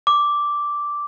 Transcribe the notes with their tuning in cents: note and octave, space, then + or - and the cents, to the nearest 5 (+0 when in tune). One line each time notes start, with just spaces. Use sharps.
D6 -5